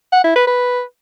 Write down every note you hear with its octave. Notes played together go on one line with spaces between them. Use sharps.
F#5
E4
B4
B4